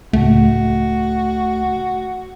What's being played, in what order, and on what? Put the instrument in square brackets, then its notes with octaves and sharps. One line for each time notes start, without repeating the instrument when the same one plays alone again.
[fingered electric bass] C#2 A2 [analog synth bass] A3 [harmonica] F#4